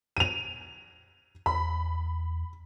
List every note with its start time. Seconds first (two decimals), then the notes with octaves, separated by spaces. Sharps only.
0.17 D#7 F7
1.46 E2 B5